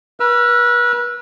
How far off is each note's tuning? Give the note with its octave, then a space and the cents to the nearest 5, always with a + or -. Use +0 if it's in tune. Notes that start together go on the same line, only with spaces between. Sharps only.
B4 -35 E6 +35